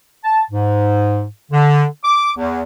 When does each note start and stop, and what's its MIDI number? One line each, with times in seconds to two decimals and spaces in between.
0.24 0.41 81
0.51 1.24 44
1.52 1.84 50
2.04 2.30 86
2.37 2.62 40